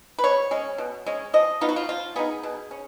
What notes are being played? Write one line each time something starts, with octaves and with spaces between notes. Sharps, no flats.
B4
B2 C#5
G#3 C#4
B2
G#3 C#4
F3 D#5
B3 D#4 F4
F#4
F4
F3 F4
B3 D#4 G#4
B2
C#4